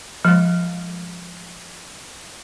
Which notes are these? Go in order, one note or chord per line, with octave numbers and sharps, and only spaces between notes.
F3 G#3